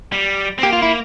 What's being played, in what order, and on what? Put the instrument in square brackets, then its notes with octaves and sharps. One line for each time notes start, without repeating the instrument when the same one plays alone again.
[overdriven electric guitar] G3
C4
[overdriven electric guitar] A#3 [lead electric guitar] G4
[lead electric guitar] F4
E4